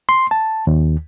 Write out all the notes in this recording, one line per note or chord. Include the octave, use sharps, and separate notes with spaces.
C6
A5
D#2